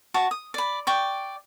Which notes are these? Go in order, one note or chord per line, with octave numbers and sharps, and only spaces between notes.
F#4 A5 C#6
D#6
D5 B5
D5 G5 C#6